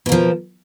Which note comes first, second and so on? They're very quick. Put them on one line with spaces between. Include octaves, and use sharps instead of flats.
B2 A#3 F3